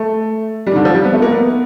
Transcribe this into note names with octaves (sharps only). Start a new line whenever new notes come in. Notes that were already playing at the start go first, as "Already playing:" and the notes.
Already playing: A3
G3
D#3
D3
F3
G3
B3
A3
A#3
B3